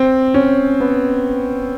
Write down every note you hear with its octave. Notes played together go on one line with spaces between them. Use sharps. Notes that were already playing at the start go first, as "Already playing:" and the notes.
Already playing: C4
C#4
B3